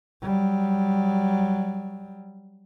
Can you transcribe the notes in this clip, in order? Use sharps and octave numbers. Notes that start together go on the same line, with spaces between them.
F#3 G3